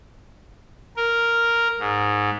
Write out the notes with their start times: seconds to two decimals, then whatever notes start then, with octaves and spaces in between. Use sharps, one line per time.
0.97 A#4
1.79 G#2